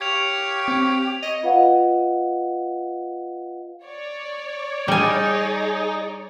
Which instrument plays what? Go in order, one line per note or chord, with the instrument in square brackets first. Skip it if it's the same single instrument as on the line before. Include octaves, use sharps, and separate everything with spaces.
[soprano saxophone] G4 [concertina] C#5 F5 C#6 [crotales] G#6 F7
[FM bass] C4
[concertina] C#5 [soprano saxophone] D#5
[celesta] F4 B4 D#5 F5 F#5
[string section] C#5 D5
[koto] G3 G#5 [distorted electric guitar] D#4 [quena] G#4